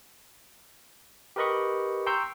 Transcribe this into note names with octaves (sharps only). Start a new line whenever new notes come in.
G4 A#4 B4 D#5 B5 C#6
G5 A#5 C6 C#6 E6 G6